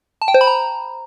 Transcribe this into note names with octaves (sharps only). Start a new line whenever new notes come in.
A5
G5
C5
B5
A#5